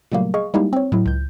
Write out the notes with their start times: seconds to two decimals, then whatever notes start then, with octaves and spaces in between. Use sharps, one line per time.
0.12 A#2 C#3 F#3 G3 A3 A#3
0.34 G#4 D#5 F5 C#6
0.54 G3 G#3 A#3 D#4 E4 G4
0.73 C4 C#5
0.92 A2 F#3 E4
1.06 C#2 G6